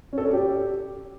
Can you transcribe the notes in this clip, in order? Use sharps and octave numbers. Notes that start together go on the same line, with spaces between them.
C#4
A4
C#4
D5
G4